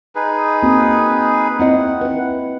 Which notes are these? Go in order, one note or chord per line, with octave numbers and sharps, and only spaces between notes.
D#4 G#4 B4
A#3 C4 F#4
C4 E4 D#5 F#5
E4 B4